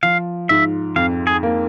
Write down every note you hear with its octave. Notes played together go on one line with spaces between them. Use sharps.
F3 F5
G#2 E5
F2 F5
G#4
A#3